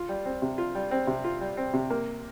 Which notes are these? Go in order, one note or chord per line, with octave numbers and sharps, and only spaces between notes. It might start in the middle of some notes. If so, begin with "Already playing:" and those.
Already playing: F4
G3
C4
C3
F4
G3
C4
C3
F4
G3
C4
C3
A#3